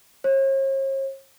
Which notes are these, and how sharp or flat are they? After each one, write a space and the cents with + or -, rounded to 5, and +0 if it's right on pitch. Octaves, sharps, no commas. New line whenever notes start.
C#5 -45